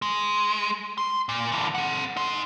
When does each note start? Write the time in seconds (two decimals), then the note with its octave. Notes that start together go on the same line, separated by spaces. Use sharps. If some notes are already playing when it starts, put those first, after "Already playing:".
0.02 G#3
0.98 C6
1.29 A#2
1.52 D3 E3
1.75 C4 F#5
2.17 D#4 C6